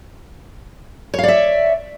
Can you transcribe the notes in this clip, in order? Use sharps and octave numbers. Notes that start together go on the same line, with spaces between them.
C#5 D5 E5 F5